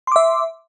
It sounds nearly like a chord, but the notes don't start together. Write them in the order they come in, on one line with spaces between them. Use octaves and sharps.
C6 D6 E5